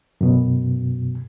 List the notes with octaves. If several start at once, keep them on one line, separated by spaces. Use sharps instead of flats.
F#2 B2